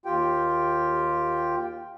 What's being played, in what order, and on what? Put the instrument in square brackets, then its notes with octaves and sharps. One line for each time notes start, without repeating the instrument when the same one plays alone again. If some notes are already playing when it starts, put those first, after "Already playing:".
[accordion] D#2 F4 G4 G5